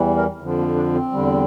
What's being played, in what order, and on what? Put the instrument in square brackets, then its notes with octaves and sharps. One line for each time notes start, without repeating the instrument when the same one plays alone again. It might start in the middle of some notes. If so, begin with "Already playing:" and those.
Already playing: [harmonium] E2 E3 G3
A#4
F2 D3 F3
A#3
D4
C4
E2 D3 G3